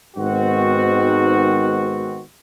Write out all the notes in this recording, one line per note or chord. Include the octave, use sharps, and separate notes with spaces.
G#1 G#2 D#3 B3 C4 F#4